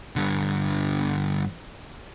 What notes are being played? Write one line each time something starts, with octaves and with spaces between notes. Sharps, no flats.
G2 D3